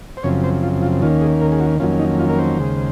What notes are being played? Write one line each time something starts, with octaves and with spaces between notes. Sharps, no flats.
C5
F#2 C#3 F3 C4 C#5
C5
F4
F4
D#2 D#3 A#3 C#4 F4
G#4
A#4
G#4
F#4
F2 D#3 F#3 A#3 C#4 F4
D#4
F4
A#4
C5
D#2 C#3 G#3